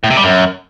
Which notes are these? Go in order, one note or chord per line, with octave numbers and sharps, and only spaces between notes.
A2
C3
G3
F#2